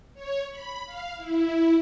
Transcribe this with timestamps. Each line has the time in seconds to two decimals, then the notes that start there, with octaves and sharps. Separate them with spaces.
0.14 C#5
0.49 B5
0.85 F5
1.17 E4